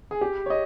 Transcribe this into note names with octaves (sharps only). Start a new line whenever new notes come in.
G#4
G4
C#5
D#5